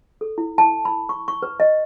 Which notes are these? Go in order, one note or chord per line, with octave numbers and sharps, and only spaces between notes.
A4
E4
A5
B5
C#6
C#6
B4
D#5